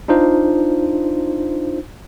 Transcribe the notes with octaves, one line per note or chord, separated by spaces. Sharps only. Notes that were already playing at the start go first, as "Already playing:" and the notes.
D4 D#4 F4 C5